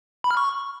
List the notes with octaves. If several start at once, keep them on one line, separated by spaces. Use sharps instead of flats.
B5
F6
C#6